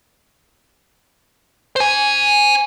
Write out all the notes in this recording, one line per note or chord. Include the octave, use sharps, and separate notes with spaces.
C5 G#5